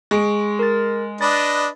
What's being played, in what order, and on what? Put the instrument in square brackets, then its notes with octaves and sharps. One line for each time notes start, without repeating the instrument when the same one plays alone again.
[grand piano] G#3 [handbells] C#6 D7
[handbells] A#4 A6
[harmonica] D4 B4 D#5 [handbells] A6